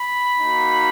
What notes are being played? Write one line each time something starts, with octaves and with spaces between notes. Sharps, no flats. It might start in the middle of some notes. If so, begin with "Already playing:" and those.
Already playing: B5
A#3 D#4 F#4